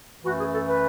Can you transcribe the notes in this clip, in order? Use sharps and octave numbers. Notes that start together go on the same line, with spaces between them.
F#2 E3 A3 F#4
G#4
A4
B4